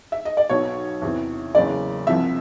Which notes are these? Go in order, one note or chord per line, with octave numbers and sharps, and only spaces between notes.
E5
D#5
D5
B1 B2 F#3 C#5
E2 C3 E3
F#1 E2 C#3 D5
C2 C3 F3 E5